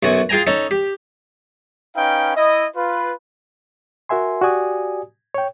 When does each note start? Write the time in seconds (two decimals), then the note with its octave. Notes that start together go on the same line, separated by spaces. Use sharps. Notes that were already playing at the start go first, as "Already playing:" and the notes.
0.03 B1 F#2 F#4 G#5
0.29 F4 G#4 G5 G#5 A#5
0.47 C#4 D#4 A4
0.71 G4
1.96 C#4 D#4 B4 F5 G5
2.36 E4 D#5
2.76 F4 B4
4.09 F#4 A#4 E5 G#5 C6
4.41 F#4 G4 D5 G#5 D#6
5.34 C#5 G5